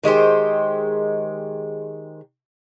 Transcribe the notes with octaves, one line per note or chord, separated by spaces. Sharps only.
D#3 G#3 G4 C5